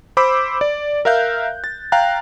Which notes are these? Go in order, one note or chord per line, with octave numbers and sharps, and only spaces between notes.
C5 B5 D6 E6
D5
A#4 E5 F5 F#6 G6
A6
F5 G5 A#5 F#6